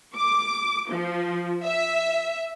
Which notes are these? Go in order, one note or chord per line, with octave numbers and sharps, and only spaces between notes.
D6
F3
E5